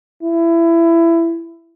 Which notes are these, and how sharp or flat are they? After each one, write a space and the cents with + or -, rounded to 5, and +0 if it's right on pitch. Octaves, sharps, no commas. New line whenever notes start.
E4 +20